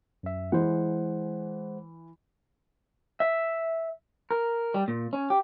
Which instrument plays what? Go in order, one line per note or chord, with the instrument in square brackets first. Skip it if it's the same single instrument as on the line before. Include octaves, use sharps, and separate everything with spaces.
[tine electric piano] F#2 E5
[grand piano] E3 [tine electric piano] G#3 C5 F#5
[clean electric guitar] E5
A#4
G3
A#2
C#4
G4